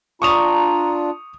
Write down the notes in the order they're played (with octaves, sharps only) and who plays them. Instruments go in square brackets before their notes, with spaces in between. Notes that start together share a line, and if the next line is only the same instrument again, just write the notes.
[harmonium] D4 F4 [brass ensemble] A#5 [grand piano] C#6 D#6 F7